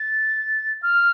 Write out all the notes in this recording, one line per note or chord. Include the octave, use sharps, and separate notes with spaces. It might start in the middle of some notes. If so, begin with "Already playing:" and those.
Already playing: A6
F6